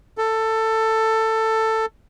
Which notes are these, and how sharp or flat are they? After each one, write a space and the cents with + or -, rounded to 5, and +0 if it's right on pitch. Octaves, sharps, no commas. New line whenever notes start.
A4 +15